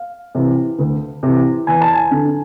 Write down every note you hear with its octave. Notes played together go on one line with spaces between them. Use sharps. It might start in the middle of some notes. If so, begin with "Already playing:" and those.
Already playing: F5
C3 E3
D2
C3 E3
E2 G#5
A5
G#5
D3